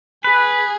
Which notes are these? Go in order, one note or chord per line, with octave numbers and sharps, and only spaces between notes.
G#4 B4